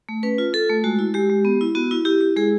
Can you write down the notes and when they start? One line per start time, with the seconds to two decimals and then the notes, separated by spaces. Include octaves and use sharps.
0.09 A3
0.23 C#4 B4
0.38 F4
0.53 F4 A4
0.69 A3
0.84 G#3 F#4
0.99 E4
1.14 G#3 G4
1.30 G#3
1.45 B3
1.61 E4
1.75 B3 F#4
1.91 E4
2.05 E4 G4
2.21 E4
2.36 G#3 G#4